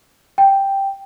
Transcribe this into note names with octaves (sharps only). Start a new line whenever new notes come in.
G5